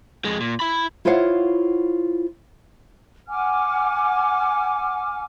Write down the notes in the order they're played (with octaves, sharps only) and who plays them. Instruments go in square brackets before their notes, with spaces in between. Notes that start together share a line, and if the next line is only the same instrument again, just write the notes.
[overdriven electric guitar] F2 G#3
A#2
E4 B5
[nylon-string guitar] E4 F4 C5 C#5 F5 F#5
[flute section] F#5 G#5 D6 F6